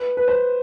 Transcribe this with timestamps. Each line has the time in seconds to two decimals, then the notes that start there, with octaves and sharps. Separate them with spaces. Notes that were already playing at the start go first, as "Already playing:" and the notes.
Already playing: B4
0.17 B4
0.28 C5